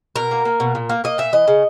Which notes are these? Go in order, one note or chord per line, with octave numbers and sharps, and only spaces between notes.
B2 A#4
A#3
A#3
B2
A#2
A#3
A#3 D#5
A#2 E5
E3 D#5
C#3